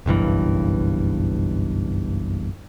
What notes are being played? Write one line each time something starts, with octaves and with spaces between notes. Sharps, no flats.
F#1 B1 G2 E3